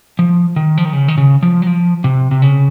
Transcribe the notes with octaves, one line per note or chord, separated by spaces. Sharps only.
F3
D#3
F3
D#3
C#3
D#3
C#3
F3
F#3
F3
C3
C3
C#3